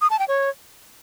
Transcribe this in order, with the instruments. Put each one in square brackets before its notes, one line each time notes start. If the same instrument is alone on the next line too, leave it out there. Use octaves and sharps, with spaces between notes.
[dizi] D#6
A5
G5
C#5